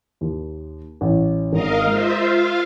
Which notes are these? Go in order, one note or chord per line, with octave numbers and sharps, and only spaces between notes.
D#2
A1
G#1 A#4 D#5 F5
G#3 F4 C5 E5
F4 F5